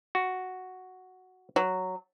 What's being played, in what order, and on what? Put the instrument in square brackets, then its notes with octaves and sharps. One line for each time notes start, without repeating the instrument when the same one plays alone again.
[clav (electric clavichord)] F#4
[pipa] F#3